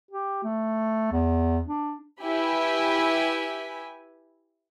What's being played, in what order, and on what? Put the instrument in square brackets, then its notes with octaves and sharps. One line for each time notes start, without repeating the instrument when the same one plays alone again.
[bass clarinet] G4
A3
E2
D4
[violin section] E4 G4 B4 G#5 B5